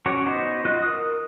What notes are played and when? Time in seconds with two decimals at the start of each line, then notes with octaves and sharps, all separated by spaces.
0.06 C#4 F#4 C#5 D5
0.26 B3 D#4 F#4 C5
0.65 F4 F#4 D#5 F#6
0.82 A#4 D#6